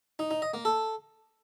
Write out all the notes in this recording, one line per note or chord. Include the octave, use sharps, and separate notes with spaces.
D#4
D#4
D#5
A#3
A4